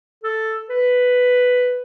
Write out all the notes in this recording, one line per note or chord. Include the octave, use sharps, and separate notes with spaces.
A4
B4